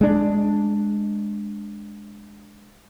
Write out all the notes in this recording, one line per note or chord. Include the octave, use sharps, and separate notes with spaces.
G#3 D4